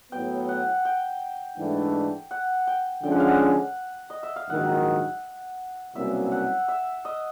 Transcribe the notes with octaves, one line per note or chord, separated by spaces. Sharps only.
A2 F#3 B3 G5
F#5
G5
G#2 E3 A3 D4
F#5
G5
D3 F3 G#3 C#4 G5
F#5
F5
F#5
D#5
E5
F5
A#1 G#2 D#3 F#3 F#5
C2 B2 F#3 A#3 C#4 E5
F#5
E5
D#5